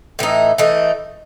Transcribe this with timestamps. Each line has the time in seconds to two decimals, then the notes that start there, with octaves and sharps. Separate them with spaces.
0.19 A2 E3 D#4
0.58 E3 A3 D#4